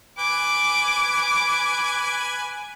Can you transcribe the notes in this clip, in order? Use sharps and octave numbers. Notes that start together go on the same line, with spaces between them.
B4 G#5 D6